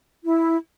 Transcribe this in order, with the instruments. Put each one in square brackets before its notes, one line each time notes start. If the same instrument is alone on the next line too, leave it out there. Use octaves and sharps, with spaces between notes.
[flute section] E4